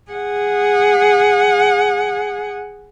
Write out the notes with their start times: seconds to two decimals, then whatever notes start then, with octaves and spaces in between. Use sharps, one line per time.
0.11 G#4 F#5